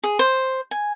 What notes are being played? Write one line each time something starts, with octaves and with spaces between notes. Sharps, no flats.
G#4
C5
G#5